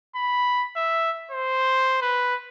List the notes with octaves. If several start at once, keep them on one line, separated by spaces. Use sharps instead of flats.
B5
E5
C5
B4